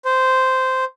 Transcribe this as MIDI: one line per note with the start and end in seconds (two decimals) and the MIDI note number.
0.05 0.85 72